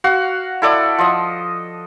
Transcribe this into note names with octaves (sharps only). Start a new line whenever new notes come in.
F#4 F5 F#5
E4 A4 D5
F3 D#5